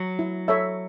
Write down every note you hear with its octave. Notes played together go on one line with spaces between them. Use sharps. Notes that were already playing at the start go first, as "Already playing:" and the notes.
Already playing: F#3
E4
A4 C#5 E5